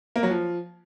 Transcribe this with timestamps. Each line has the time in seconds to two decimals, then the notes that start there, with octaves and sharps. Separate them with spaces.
0.16 A#3
0.23 F#3
0.30 F3